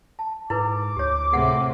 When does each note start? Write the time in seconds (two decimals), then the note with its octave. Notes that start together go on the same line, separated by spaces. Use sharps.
0.19 A5
0.50 G#2 E4 A#4 B4 D6
0.96 D2 G4 C#5
1.33 A2 C3 G#4 F#5